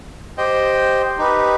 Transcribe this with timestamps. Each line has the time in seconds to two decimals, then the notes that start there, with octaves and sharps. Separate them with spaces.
0.38 G4 C5 D#5 G5
1.19 D#4 G4 B4